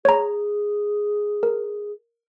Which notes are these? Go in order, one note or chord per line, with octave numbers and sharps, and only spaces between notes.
G#4 C#5 A#5
A#4